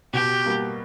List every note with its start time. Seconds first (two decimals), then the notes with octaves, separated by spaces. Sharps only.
0.13 B2 G4
0.46 G3 A#3